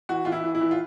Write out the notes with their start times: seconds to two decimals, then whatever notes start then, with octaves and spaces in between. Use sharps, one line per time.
0.09 E3 F#4
0.25 E3 F4
0.32 E4
0.44 E3
0.55 E4
0.61 E3
0.71 F4